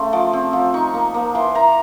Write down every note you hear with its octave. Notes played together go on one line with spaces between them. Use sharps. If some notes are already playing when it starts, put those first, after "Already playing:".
Already playing: C#3 A3 C6
F3 D6
C4
F3
D#4 C#6
A#3
A#3
E3 C6
E3 A#5